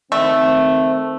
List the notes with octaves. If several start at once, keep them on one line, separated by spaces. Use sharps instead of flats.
D#3 A3 C4